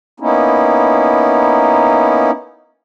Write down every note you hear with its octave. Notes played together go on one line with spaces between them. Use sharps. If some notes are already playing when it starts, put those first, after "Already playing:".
A#3 B3 C#4 D#4 E4